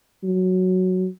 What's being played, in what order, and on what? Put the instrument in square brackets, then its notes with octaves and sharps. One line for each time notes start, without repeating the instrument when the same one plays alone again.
[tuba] F#3